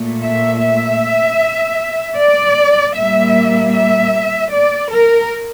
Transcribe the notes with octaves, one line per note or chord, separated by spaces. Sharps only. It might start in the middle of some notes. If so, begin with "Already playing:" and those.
Already playing: A#2 A3
E5
E5
D5
A#2 G3 A#3 E5
E5
D5
A#4